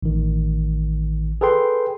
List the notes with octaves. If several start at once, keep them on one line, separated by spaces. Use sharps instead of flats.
A1 D#3
G#4 A4 B4 G5 C6